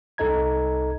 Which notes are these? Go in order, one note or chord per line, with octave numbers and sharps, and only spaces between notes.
C2 D#4 A4 D#5 A#5 G#6